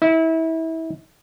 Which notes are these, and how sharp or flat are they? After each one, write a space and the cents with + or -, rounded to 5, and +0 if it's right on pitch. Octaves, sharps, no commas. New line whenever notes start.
E4 -30